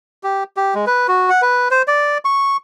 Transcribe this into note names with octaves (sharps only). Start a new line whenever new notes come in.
G4
G4
G#3
B4
F#4
F#5
B4
C5
D5
C#6